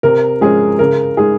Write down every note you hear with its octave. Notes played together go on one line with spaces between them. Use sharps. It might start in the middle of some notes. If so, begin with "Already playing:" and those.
C3 A#4
F3 G#3 C#4 G#4
C#3 A#4
G#3 D#4 G#4